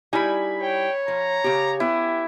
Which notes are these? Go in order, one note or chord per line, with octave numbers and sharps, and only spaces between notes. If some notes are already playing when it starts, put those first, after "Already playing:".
G3 D#4 E4 G#5 B5
C#5 G5
F3 A#5
C#3 G4
B3 E4 G4